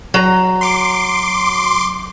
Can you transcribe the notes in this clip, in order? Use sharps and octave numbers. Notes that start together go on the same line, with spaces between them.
F#3 A#5
C6 D6